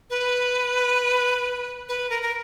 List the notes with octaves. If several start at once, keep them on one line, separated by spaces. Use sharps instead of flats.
B4
B4
A#4
A#4